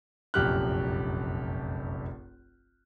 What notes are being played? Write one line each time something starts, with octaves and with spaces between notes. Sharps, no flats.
F1 A#1 F#2 G4 F6 F#6